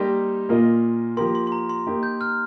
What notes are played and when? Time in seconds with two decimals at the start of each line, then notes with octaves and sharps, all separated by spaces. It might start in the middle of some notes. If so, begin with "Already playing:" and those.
Already playing: G3 A#3 D#4 G4 D#5 C6
0.49 A#2 A#3 F4 A#4 D#5
1.17 F3 A#3 G4 A#4 C6
1.35 C6
1.47 C6
1.52 A#5
1.69 C6
1.87 A#3 D#4 G4
2.03 G6
2.21 F6